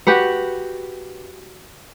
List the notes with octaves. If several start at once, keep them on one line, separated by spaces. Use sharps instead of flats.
F#4 G4 B4 F#5